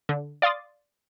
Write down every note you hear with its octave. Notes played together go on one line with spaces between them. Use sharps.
D3
D5 F5 C6 D#6 A6